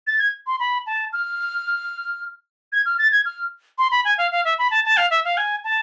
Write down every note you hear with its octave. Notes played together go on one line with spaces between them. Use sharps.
A6
G#6
C6
B5
A5
F6
G#6
F6
A6
G#6
F6
C6
B5
G#5
F5
F5
E5
B5
A5
A5
F5
E5
F5
G#5
A5